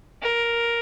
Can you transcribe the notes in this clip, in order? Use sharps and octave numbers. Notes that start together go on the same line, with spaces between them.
A#4